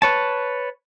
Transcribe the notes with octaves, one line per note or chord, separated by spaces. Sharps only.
B4 C#5 A5